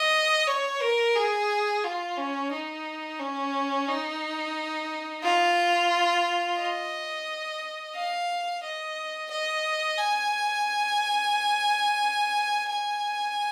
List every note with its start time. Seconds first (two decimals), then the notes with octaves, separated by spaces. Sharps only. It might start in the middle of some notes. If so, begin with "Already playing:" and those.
Already playing: D#5
0.48 C#5
0.81 A#4
1.15 G#4
1.84 F4
2.17 C#4
2.52 D#4
3.20 C#4
3.88 D#4
5.23 F4
6.59 D#5
7.95 F5
8.63 D#5
9.30 D#5
9.98 G#5
12.70 G#5